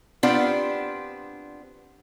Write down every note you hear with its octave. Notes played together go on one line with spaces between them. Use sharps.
B3 C4 D4 F4 G4